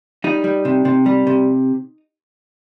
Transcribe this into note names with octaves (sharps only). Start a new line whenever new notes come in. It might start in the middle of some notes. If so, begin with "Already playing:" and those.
G3 D#4
G3
C3
C3
G3
C3